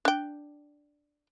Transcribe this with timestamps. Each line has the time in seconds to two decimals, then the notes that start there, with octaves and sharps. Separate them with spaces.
0.05 D4 G5